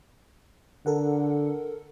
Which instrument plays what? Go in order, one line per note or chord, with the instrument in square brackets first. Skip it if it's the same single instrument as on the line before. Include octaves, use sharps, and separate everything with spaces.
[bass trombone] D3 [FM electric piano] A4 A#4 F#5